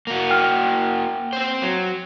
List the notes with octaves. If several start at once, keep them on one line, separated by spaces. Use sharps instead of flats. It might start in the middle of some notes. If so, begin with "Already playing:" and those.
A#3 F#4
G5 F6
C4 C5
F#3